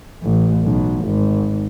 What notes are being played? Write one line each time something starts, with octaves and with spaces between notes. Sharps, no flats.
A1
B1
G#1